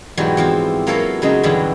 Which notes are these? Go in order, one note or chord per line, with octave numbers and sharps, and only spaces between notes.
G#2 B2 E3 F#3 G3
E3 F3 C4
F#3 A#3 B3 A4 C#5 F5
C#3 F#3 G#3 D#4
G2 B2 D3 E3 F#3